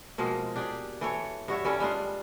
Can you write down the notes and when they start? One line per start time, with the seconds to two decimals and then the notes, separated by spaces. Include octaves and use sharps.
0.18 B2 F3 G#3 A#3
0.56 D4 G4 G#4 D5
1.01 E3 A4 C#5
1.48 G2 F#4 C#5 E5
1.65 E3 G3 C#4 A4
1.80 G3 G#3 D4 F4